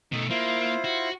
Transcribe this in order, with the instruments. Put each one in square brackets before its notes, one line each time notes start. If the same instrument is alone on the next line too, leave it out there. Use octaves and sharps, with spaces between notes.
[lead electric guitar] B2 A3 [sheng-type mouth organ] D#4
[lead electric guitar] A#3 [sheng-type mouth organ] E4 F4 C5
[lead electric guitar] F#4